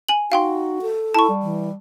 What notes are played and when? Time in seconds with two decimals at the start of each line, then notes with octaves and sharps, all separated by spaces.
0.09 G#5 F#7
0.32 D#4 F#4 F5 G5 C6
0.82 A4
1.14 E4 A5 C#6
1.29 G3
1.43 E3